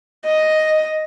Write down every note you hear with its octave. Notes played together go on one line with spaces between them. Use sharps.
D#5